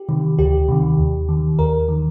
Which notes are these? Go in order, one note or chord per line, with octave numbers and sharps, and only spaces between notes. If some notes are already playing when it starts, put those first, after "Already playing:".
Already playing: G4
C3 D#3
D2 G4
C3 D#3
D#2
D#3
D#2 A#4
D#3